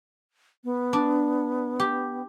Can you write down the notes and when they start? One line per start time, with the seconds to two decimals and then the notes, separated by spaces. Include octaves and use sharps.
0.64 B3
0.93 D4
1.80 G4